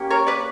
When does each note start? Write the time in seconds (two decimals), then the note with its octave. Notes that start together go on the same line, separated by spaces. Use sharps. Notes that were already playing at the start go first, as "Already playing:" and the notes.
Already playing: A#3 C#4 G4
0.10 A#4 C#5
0.27 B4 D5